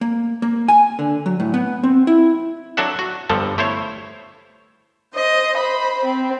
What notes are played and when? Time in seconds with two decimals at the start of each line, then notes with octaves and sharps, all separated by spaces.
0.01 A#3
0.42 A#3
0.68 G#5
0.99 D3
1.26 F#3
1.40 A2
1.54 B3
1.83 C4
2.07 E4
2.77 F#3 D4 F#4 A4 E5 F#5
2.99 F#4
3.30 G1 G2 D3 F3 A4
3.58 A3 E4 C5 C#5
5.12 C5 D#5
5.57 C5 B5
6.05 C4